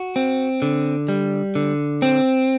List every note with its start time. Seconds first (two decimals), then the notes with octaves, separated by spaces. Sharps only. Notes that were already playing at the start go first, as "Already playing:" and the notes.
Already playing: F#4
0.16 C4
0.62 D3
1.09 G3
1.55 D3
2.02 C4